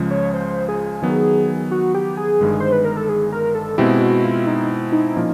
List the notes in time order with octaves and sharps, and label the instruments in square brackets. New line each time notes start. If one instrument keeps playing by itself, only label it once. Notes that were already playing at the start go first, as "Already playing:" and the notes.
Already playing: [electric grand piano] C#2 C#3 F3 G#3
[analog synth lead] C#5
C5
G#4
[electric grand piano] D#3 F#3 B3
[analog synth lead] F#4
G4
G#4
[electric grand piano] G1 G2 D#3 G#3
[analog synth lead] C5
B4
A#4
A4
G#4
A#4
A4
[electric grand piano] B2 G#3 C4 E4 [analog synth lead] G4
[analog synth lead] F#4
F4
D#4
D#4
[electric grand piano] A#2 F3 A#3 C#4 F4